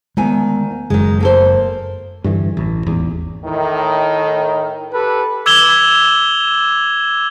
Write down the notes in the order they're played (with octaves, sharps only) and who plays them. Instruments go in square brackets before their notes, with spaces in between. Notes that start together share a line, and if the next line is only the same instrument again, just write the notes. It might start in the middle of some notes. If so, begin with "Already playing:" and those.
[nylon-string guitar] D2 D#3 G#5 [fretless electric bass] G#3 B3
[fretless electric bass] F#1 F#2 F#3 [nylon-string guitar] D#3 G#3
[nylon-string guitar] A#3 A4 C5
[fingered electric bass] G2 D3 E3
A1
D#1 G#1 E2
[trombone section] A2 D#3
G4 A4 B4
[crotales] D6 E6 G#6 E7 F7 G7